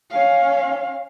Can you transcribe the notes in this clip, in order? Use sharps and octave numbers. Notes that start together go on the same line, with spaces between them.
C#4 F5